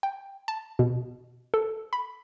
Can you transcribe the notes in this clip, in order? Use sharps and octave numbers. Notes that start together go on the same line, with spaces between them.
G5
A5
B2
A4
B5